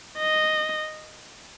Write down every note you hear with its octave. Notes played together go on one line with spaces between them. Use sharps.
D#5